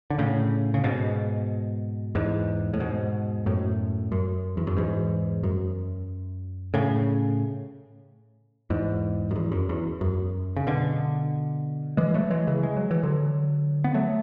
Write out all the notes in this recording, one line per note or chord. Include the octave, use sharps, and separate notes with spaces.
D3
A2 C#3
C#3
G#2 B2
E2 G#2
A2
G#2 B2
F#2 A2
F#2
E2
F#2
E2 G#2
F#2
A2 C#3
E2 G#2
F#2
E2
F#2
E2
F#2
C#3
B2 D3
E3 G#3
F#3 A3
E3 G#3
C#3 E3
G#3
F#3
E3
D3 F#3
B3
F#3 A3